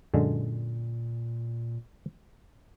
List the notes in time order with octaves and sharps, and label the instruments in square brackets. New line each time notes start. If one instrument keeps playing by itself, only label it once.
[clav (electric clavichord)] F#2 D3 G#3 [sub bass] A#2